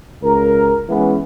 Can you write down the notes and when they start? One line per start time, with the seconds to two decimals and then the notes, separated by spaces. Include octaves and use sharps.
0.22 C#2 A#4
0.89 E3 G#3 B3 C#4